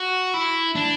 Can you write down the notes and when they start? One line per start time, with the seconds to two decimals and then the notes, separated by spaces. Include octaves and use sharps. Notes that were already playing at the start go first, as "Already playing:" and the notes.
Already playing: F#4
0.34 E4
0.75 D4